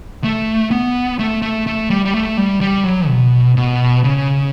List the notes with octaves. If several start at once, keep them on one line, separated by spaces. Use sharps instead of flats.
A3
B3
A3
A3
A3
G3
G3
A3
G3
G3
F#3
B2
B2
C#3